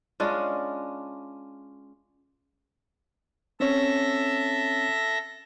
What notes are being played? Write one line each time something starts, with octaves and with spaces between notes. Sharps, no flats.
G#3 C#4 D4 F4
C4 C#4 A4 C#5 E5 A#6